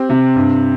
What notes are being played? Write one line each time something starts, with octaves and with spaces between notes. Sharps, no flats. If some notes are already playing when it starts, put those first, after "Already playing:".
Already playing: C4 G4
C3
G2